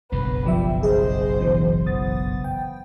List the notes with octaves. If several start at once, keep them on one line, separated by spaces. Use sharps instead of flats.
F#1 B1 G2 B4
F3 G3 E5
G#4 C5 D#5
B2 E3
B3 D#6 A6
G5